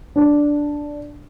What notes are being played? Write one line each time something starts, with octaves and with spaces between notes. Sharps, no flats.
D4